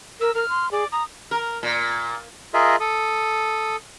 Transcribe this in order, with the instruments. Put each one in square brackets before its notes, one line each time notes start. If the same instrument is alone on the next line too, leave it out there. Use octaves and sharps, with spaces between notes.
[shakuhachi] A#4 [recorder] E6
[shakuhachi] A#4 [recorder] F6
[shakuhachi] C6
[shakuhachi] G#4 [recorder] D5
[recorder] A#5 [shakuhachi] D#6
[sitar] A#4
A#2
[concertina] F4 G#4 A#4 D#5 E5
A4 D#6